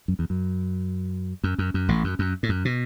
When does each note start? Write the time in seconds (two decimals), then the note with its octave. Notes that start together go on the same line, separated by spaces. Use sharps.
0.08 F#2
0.19 E2
0.30 F#2
1.44 F#2
1.58 F#2
1.74 F#2
1.88 A1 A2
2.04 F#2
2.19 F#2
2.43 A2
2.49 F#2
2.65 B2